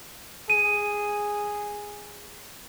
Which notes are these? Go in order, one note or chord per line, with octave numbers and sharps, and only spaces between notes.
G#4 D#7